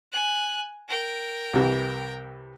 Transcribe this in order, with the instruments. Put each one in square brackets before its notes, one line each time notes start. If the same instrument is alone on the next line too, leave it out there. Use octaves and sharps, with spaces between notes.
[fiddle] G#5 F#6
A#4 G5
[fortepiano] C2 C3 E3